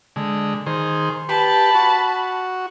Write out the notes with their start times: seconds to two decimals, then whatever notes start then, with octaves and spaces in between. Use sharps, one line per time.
0.16 D3 G#3
0.66 D#3 G#4 C5
1.29 G4 B4 A5 B5
1.74 F#4